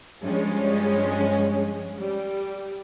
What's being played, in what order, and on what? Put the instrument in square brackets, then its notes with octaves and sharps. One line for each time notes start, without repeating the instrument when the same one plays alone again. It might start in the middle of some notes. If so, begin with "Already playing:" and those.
[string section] G2 F3 G#3 C#4
G3